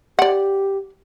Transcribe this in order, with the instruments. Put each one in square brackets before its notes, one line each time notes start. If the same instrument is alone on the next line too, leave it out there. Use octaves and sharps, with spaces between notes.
[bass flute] G4 [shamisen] D5 F#5